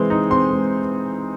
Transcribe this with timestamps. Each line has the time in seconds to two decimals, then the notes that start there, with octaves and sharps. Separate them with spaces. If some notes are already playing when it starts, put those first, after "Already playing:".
Already playing: E3 G#3 C4
0.10 D#4
0.30 C4 C6
0.50 G#3